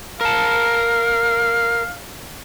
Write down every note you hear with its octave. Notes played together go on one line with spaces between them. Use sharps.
A#4 F5 A5